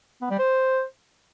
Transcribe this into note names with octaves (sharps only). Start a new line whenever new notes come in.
B3
G3
C5